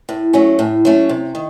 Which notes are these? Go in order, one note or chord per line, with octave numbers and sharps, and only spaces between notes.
A2
F#3 A3 C#4
A2
F#3 A3 C#4
C3
D#3